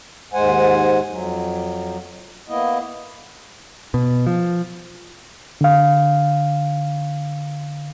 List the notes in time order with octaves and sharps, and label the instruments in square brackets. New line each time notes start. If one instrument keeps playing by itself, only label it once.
[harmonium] D#2 G#2 G#3 C5 F#5 G#5
F2 F#3
A#3 B3 E4 D#5
[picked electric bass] B2
F3
[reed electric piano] D3 F5